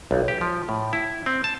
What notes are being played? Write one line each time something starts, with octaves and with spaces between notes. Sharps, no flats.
B1
G4
F3
A2
E4
C4
A5